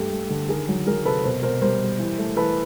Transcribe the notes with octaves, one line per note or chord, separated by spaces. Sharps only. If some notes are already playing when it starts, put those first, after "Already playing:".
Already playing: G2 A3 G4 A4
A3
D3
D#3 G#4 A#4
F#3
F#3 G#4 A#4
C3 A4 B4
B2 A#4 C5
B2 A#4 C5
G3 A#4 C5
G3
E3
A3
E3 A4 B4